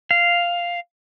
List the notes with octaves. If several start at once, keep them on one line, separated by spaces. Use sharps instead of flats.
F5